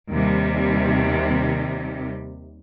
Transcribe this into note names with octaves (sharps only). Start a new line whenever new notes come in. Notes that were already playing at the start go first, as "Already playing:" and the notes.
D#2 C3 G3